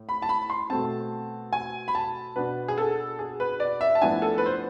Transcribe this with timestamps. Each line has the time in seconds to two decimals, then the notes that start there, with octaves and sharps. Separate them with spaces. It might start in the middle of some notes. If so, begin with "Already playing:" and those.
Already playing: A2
0.09 B5
0.22 A5
0.29 B5
0.50 C6
0.70 B2 A3 C4 A5
1.53 G#5
1.88 B5
1.95 A5
2.36 B2 B3 D4 B4
2.68 G#4
2.78 A4
3.19 G#4
3.40 B4
3.60 D5
3.81 E5
3.95 A5
4.02 A2 F3 B3 D4 G#5
4.22 A4
4.38 B4
4.46 C5